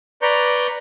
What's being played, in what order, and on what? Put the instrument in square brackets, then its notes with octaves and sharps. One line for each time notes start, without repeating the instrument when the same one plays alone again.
[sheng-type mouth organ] B4 D5 A#5 C#6 G6